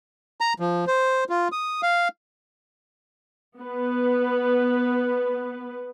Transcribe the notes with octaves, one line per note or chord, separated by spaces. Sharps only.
A#5
F3
C5
F4
D#6
F5
B3 B4